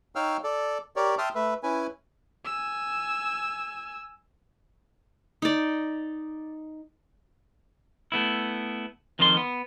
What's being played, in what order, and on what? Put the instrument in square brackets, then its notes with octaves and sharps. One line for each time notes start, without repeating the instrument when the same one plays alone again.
[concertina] D#4 C#5 F5 G5 E6 F6
A4 D5
G4 A#4 C#5 D5
E5 G5 A5 C6 D#6 F6
A3 B4 E5
C#4 E4 B4 G#5
[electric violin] G#5 E6
[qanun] D#4 D5
[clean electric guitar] A3 B3 E4
F2 D#3 F3 F4 A4 C6
B3